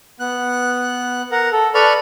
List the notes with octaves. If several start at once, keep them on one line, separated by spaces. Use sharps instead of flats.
B3 F#6
A#4 F#5
A4
A4 B4 D5 B5 C#6 F6